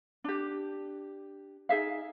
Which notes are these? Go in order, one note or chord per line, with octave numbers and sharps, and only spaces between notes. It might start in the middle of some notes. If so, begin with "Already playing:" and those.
D4 G4
D#4 G#4 E5 F5